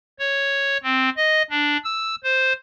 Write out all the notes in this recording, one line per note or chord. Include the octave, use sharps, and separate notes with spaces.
C#5
C4
D#5
D4
E6
C5